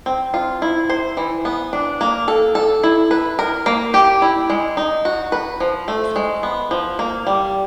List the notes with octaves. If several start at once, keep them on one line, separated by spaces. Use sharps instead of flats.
C4
F4
E4
C5
E3
B3
D4
A#3
A4
A4
E4
B4
A#4
A#3
G4
E4
G#3
D#4
F#4
B4
F3
A3
G#3
B3
F3
A#3
G3